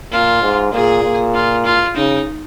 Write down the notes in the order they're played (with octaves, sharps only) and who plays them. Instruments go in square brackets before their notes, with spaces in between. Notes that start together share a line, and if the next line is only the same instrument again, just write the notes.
[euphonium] A#2 [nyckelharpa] F4
[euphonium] G#2
[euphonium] A#2 [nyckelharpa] G#4
[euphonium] A#2
[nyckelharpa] F4
F4
[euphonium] C#3 [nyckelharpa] D#4